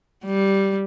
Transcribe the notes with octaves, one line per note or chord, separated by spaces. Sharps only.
G3